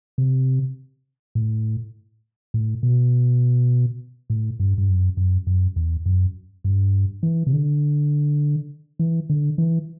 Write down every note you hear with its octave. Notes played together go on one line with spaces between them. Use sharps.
C3
A2
A2
B2
A2
G2
G2
F#2
F#2
F#2
E2
F#2
G2
E3
C3
D3
E3
D3
E3